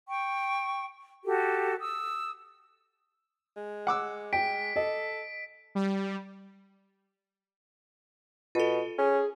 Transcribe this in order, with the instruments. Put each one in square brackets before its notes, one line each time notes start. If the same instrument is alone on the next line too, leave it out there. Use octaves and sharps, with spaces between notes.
[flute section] G5 C#6
F#4 G4 A4
D#6 E6
[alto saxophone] G#3
[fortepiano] F#5 D6 E6
[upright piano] G5 [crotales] B6 D7
[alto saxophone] A4 [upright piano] D#5
[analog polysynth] G3
[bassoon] B2 [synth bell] F4 A4
[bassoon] C#4 [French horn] G#4